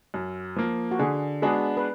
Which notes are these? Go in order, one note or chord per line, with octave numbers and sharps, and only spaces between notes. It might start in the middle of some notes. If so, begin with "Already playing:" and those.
F#2
F3 A#3
F#4
D3 G#4
G#3 B3 D4 F#4 G#4
B4